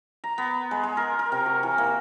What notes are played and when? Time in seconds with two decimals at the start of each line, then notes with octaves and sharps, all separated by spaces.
0.24 A#5
0.38 B3
0.71 G#3
0.83 G#3
0.97 A#4
1.19 A#4
1.32 C3
1.46 F#4
1.63 E3
1.78 A#3